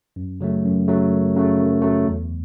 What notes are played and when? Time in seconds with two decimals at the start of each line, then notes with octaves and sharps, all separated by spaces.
0.16 F#2
0.41 C#3 F#3 A3
0.64 F#2
0.88 C#3 F#3 A3
1.11 F#2
1.36 C#3 F#3 A3
1.59 F#2
1.82 C#3 F#3 A3
2.06 E2